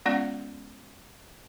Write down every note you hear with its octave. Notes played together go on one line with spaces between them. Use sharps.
G#3 B3 C#4 F4 D5 F#5